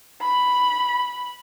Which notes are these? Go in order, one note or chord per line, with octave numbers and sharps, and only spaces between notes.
B5